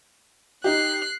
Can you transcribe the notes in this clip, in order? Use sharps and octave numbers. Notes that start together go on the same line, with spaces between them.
D#4 G4 F#6 C7